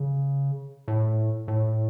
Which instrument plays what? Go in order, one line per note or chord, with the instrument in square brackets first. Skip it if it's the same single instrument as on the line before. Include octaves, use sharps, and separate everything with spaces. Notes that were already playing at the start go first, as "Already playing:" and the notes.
Already playing: [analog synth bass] C#3
A2
A2